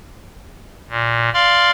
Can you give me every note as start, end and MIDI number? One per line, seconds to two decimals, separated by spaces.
0.89 1.30 46
1.34 1.71 74
1.34 1.71 77
1.34 1.71 84
1.34 1.71 89